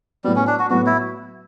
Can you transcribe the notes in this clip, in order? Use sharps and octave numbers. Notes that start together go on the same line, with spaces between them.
A2 F#3 G3 B3
C#4
D4
F#4
A2 F#3 B3 F#4
E4